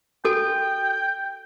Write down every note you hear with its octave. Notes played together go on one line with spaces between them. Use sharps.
F#4 A4 G5 G#5